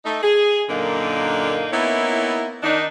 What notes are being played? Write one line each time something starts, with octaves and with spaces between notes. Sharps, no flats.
A3 D#4
G#4
F#2 A#2 D3 A#3 D4 D#4
A#3 B3 C#4 D#4 E4
D#3 D4 D#4